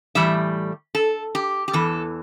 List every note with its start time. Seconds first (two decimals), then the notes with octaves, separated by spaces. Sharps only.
0.15 A2 E3 G3 E5
0.95 A4
1.35 G4
1.68 G4
1.73 E2 E3 A4